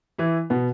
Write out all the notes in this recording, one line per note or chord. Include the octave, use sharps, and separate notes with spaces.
E3 E4
B2 B3